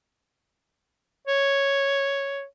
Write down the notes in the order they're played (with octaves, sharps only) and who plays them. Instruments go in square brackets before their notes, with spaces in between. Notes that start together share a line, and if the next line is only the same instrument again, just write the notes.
[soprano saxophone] C#5